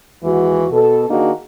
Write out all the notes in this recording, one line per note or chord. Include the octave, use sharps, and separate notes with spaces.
D#2 E3 G#3 F#4
B2 A4
D#3 A#3 D4 D#4 F#4 G#4